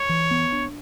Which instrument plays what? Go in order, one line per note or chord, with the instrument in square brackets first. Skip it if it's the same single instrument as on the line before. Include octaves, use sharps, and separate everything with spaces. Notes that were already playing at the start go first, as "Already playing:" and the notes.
Already playing: [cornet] C#5
[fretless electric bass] E3
B3
D4